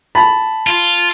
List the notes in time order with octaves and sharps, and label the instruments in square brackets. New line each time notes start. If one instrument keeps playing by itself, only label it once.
[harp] A5 [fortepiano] B5
[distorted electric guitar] F4